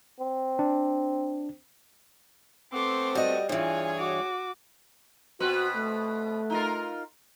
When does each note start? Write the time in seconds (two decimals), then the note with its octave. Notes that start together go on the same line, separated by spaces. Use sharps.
0.19 C4
0.59 D4
2.73 A3 B3 C4 C6 D6
3.15 G3 F#4 D#5
3.49 G2 E3 F4 G#4 C#5 G#5
3.97 F#4 D6
5.40 B2 C4 F#4 B4
5.76 A3
6.50 D#4 F4 A#4